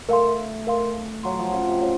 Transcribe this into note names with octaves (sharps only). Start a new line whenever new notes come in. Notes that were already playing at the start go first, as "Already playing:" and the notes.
A3 A#4 F5 C6
A#4 F5 C6
F#3 C#5 F5 C6
F3
C#3
C3
C#3 C#5 F5